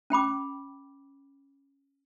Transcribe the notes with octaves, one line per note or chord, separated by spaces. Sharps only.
C#4 G5 B5 D6